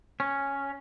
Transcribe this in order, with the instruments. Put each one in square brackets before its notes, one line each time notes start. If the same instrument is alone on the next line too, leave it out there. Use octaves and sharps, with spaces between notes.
[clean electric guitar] C#4